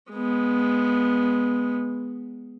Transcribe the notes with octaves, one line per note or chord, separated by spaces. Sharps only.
G#3 B3